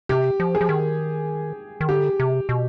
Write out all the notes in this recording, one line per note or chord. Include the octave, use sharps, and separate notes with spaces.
C3 G4
F3
G#4
F3
D#3
D#3
D3 G4
C3
B2